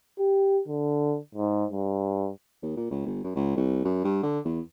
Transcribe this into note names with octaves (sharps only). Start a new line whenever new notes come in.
G4
D3
G#2
G2
D#2
A#2
C#2
G1
F#2
C#2
C2
F#2
G2
D3
E2